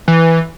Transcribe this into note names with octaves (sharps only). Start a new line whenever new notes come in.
E3